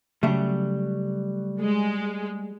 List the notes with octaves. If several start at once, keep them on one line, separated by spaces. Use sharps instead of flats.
C#3 F#3 G3 A3 E5
G#3